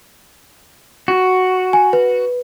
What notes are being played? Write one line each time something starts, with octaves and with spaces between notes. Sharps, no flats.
F#4
G#5
B4